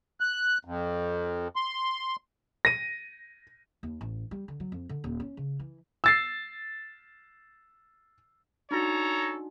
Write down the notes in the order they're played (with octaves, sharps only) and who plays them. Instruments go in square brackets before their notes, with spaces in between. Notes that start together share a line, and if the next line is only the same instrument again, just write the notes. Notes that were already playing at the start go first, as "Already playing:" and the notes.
[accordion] F#6
F2
C6
[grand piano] A#6 D#7
[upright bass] D#2
A1
G3
D3
F#3
F2
D3
D#1
C#4
C#3
E3
[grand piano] E6 A6 C7
[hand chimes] D4 D#4 F#4 [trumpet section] A4 C#5 A#5